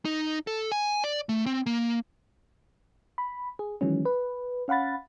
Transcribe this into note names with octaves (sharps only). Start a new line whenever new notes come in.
D#4
A4
G#5
D5
A3
C4
A#3
B5
G#4
D#3 E3 F#3 G#3 C#4
B4
C#4 F5 F#5 B5 A6